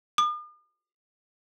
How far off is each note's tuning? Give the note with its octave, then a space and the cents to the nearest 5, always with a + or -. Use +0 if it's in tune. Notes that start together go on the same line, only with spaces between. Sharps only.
D#6 -45